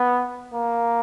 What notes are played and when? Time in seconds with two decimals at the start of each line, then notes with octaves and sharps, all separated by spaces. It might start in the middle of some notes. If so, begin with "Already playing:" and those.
Already playing: B3
0.54 A#3